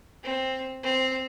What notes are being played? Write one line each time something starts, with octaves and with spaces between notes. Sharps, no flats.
C4
C4